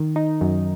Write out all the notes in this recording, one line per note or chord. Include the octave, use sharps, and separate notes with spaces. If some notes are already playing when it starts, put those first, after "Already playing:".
Already playing: D#3
D#4
F#2